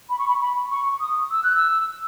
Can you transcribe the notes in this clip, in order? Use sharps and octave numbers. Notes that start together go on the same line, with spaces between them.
B5
C#6
B5
B5
C#6
D#6
E6
F#6
E6